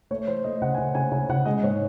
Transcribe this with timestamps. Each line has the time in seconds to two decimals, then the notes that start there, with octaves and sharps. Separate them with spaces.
0.11 A3 C#5
0.27 E3 C5
0.44 A3 D#5
0.62 C#3 F#5
0.74 G#5
0.78 C#3 F#5
0.95 C#3 G#5
1.12 C#3 G#5
1.29 C#3 F#5
1.46 G#3 D#5
1.63 G#2 C#5